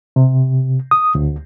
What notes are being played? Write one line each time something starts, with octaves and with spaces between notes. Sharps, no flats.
C3
D#6
D2